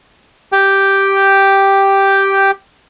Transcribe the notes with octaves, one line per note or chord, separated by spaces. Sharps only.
G4 G5